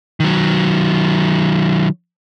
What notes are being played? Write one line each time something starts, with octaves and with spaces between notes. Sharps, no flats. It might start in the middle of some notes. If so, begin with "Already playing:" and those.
D#3 F#3